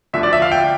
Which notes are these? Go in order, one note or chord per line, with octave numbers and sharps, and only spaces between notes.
D2 D3 F3 E5
D5
E5
F5
G5